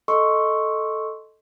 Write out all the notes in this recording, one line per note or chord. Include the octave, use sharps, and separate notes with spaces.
A4 D#5 C6 C#6 E6